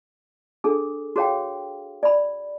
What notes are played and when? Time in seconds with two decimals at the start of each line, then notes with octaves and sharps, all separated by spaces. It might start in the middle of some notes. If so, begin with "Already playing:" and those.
0.64 D4 G#4 A4
1.16 F#4 G#4 C#5 F5 G5
2.03 D5 B5